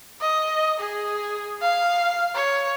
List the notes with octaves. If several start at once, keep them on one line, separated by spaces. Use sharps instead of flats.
D#5
G#4
F5
C#5